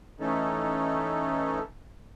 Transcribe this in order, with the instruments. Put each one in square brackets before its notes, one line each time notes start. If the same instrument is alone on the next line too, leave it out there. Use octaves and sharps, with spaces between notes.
[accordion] E3 A3 C#4 D#4 A4